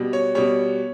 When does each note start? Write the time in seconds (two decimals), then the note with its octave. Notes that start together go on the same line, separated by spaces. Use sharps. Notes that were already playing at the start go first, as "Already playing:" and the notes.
Already playing: B2 G3
0.13 C#5
0.35 B2 G3 C#5